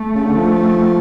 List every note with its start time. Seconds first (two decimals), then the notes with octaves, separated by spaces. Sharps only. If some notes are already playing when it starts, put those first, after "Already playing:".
Already playing: A3
0.15 C#3
0.25 D3
0.36 F3